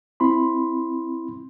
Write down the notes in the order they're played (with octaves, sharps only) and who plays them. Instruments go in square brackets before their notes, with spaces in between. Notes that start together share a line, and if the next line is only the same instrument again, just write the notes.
[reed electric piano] C4 E4 B5 C6